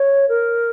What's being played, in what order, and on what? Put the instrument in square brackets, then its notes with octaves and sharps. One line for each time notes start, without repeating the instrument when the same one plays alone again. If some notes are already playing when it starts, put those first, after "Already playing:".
Already playing: [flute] C#5
A#4